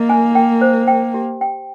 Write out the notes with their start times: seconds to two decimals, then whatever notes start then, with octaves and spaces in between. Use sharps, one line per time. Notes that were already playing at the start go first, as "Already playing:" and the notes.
Already playing: A#3 D#5
0.09 G#5
0.35 G5
0.61 C5
0.88 G5
1.14 G4
1.41 G5